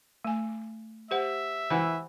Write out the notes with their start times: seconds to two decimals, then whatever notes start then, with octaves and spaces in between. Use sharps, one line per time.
0.24 A3 G#5
1.11 G4 C5 E5 F#5
1.70 E3 C5 F#5